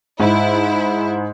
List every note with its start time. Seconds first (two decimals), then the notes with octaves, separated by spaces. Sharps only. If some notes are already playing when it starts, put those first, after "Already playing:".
0.20 G#2 E4